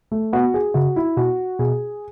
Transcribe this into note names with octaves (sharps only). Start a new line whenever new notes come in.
A3
B3 F#4
G#4
C#3 F#4
E4
B2 F#4
B2 G#4